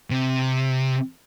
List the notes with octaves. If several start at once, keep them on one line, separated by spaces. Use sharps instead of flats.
C3